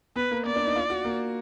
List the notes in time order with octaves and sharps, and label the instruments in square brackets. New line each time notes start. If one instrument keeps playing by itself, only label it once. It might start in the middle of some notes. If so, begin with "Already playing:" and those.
[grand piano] B3 [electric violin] B4
[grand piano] A#3
[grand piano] B3 [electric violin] D5
[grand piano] D4
D#4
F4
F#4
A#3